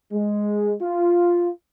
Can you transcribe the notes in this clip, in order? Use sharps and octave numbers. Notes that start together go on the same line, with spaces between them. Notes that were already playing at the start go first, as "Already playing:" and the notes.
G#3
F4